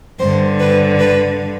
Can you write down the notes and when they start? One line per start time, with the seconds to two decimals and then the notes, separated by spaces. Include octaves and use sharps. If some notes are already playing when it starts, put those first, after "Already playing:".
0.18 G2 D3 C5
0.59 B4
0.99 B4